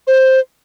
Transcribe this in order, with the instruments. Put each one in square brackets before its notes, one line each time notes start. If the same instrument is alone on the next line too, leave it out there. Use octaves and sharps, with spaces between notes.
[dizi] C5